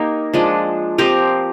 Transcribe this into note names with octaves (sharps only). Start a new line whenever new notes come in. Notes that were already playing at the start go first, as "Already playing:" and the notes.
Already playing: A#3 D#4 G4 A#4
F3 G#3 D4
F3 C4 G4 A#4